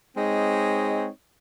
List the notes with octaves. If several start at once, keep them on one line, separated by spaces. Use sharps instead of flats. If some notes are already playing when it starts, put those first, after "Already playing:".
G#3 C4 D#4 C#5 D#5